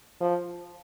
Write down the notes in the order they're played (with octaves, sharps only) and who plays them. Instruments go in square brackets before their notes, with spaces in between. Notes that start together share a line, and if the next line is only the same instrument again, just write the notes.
[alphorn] F3